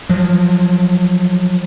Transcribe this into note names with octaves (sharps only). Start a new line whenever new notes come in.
F3 F#3